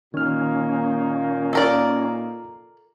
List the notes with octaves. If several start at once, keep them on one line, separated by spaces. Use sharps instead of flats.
A#2 D#3 A#3 C#4 D#4 F6
F4 A4 A#4 D5 A#5